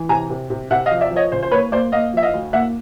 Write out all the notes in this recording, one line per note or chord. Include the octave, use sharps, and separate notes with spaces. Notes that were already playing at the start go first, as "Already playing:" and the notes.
Already playing: E3
C3 G#5 A#5
C3
C3
C3 E5 F#5
D#5 F5
F3
D5 E5
F3
C#5 D#5
C#3 C5
C5
A#3 B4 C#5
A#3 C5 D5
A#3 D#5 F5
F3 E5
D#5 F5
D2
A#3 E5 F#5